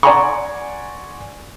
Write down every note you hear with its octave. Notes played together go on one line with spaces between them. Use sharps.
D5 F#5 G#5 A#5 C6 C#6